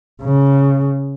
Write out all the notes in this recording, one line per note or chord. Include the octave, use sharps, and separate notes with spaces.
C#3